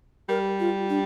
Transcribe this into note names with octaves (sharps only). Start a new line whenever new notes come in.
G3 A#4
F4
D4